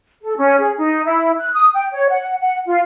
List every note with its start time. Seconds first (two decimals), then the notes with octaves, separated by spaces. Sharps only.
0.23 A4
0.37 C#4
0.59 G#4
0.78 D#4
1.05 E4
1.38 F#6
1.54 D#6
1.73 G5
1.93 C#5
2.09 F#5
2.40 F#5
2.66 F4